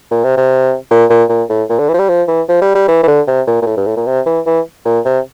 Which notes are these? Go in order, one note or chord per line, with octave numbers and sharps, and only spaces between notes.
A#2
C3
C3
A#2
A#2
A#2
A2
A#2
D3
E3
F3
G3
F3
E3
F3
G3
G3
E3
E3
D3
C3
A#2
A#2
A2
G2
A2
A#2
C3
E3
E3
A#2
C3